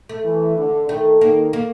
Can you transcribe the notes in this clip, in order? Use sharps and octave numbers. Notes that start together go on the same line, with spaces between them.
A3
E3
D3
D#3 A3
D#3 A#3
A#3